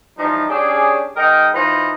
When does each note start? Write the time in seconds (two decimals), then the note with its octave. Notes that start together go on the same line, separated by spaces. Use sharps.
0.18 E3 F3 G3 D#4
0.48 C#4 D4 G4 G#4
1.16 G#2 D#4 A#4 D#5 G5
1.54 E3 D#4 F4 B4 C5